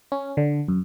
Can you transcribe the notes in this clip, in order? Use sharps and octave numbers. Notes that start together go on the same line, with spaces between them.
C#4
D3
F#2